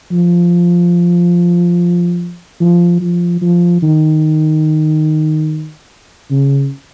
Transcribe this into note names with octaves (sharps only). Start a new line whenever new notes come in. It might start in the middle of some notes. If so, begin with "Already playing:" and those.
F3
F3
F3
F3
D#3
C#3